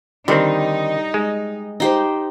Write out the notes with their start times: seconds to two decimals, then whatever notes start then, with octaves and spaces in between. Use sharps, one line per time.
0.28 D3 D#3 G3 C4 D#4
1.14 G#3
1.80 D#4 G4 C5